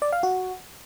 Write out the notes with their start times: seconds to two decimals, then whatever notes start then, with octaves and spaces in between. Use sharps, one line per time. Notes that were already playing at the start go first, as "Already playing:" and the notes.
0.02 D5
0.13 F5
0.23 F#4